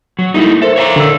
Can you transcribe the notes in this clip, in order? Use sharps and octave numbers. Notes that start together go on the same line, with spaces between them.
F#3
G3 A3 A#3 D#4 E4
A4 A#4 C5 E5
C#5 F5 A#5
D3 A#4 E6